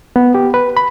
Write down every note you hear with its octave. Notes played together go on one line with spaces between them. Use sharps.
B3
G4
B4
B5